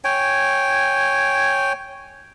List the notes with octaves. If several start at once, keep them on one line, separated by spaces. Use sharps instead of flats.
C#5 G5 G#5